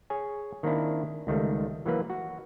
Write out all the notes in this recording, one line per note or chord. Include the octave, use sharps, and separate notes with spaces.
G#4 C#5 G#5
D#3 A#3 C4 D4 E4
C#2 D#3 G3 A3
E3 F#3 A#3 B4
F#4